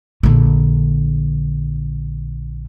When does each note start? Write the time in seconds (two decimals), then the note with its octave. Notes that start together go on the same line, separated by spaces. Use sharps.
0.23 A#1 D3